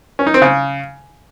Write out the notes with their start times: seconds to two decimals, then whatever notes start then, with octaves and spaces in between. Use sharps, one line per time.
0.19 C#4
0.27 D#4
0.34 C4
0.42 C#3